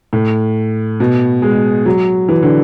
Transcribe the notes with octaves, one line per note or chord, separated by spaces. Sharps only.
A2
B2
G#3
F#3
E3
D3